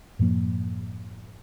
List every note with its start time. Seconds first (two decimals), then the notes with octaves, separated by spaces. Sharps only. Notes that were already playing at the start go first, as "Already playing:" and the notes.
0.19 F#2 A2 F3 A#3